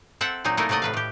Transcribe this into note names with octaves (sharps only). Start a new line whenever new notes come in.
C4 A4 E5 F#5
A#2 F#3 C4 D#4
A3 A#3 D#4 E4 A#4
C3 F#3 A3 D5 D#5
A2 B4 F5
A2 G4